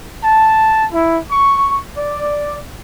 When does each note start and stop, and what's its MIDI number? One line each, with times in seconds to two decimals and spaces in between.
0.24 0.84 81
0.91 1.18 64
1.31 1.80 85
1.97 2.57 74